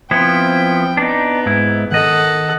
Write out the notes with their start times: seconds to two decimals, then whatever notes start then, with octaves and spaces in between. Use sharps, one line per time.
0.11 F3 B3 C4 E4 G5
0.97 B3 D4 D#4
1.46 G#2 E4
1.92 D#3 A4 D#5 F#5